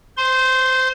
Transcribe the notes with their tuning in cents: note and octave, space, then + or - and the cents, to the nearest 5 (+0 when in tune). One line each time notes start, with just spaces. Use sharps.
C5 -20 C6 +5